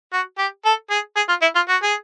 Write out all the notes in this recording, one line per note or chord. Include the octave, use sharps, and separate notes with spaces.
F#4
G4
A4
G#4
G#4
F4
E4
F4
F#4
G#4